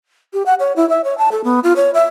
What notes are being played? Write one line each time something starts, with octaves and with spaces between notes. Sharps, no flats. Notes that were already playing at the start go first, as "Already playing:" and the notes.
G4
F#5
C#5
E4
E5
C#5
A5
A4
B3
F4
C#5
E5